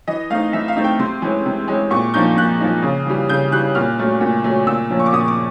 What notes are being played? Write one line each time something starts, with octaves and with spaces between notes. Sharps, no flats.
E3 D#5
A3 C4 D#4 F5
E3 E5
F5
A3 C4 D#4
G5
C3 C6
E3 G#3 C#4
C3
E3 G#3 C#4
A#2 C#6
F3 A#3 D#4 G6
A#2 F#6
F3 A#3 D#4
C#3
E3 G3
C#3 G6
E3 G3 F#6
A#2 F6
F#3 A3 C#4
A#2
F#3 A3 C#4
A#2 E6
F3 A#3 C#4
C#6
D6
A#2 D#6
D6